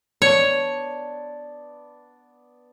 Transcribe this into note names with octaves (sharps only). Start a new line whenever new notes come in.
B3 D4 C#5 D5